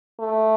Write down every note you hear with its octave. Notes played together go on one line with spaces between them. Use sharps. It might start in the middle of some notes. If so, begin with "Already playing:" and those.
A3